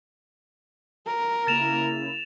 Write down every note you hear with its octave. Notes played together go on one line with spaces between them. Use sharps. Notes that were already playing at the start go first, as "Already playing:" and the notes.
A#4
C#3 A#3 E4 A6 E7 F7